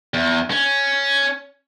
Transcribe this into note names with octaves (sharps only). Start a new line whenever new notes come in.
E2
C#4